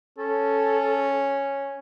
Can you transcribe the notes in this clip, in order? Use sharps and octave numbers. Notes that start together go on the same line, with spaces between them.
C#4 A4